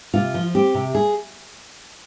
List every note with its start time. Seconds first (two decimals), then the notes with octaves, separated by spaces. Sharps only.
0.14 C3 F4
0.34 F3
0.54 C4 G4
0.75 C3
0.95 G#4